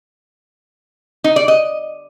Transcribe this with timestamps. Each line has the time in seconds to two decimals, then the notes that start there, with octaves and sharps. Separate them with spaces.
1.24 D#4
1.36 D5
1.48 D#5